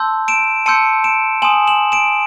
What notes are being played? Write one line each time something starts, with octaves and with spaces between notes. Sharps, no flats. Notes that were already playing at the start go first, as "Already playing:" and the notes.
Already playing: A5 C6 E6 G6
D7 E7
A5 C6 E6 G6 C#7 D#7
D7 E7
G#5 C6 D#6 E7 F#7
E7 F#7
D7 E7